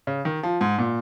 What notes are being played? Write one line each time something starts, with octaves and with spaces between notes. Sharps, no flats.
C#3
D#3
F3
G#2
A#2